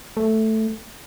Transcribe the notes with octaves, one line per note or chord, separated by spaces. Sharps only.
A3